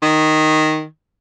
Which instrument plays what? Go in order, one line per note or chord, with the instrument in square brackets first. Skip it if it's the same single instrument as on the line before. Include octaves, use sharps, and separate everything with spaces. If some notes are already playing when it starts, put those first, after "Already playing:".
[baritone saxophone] D#3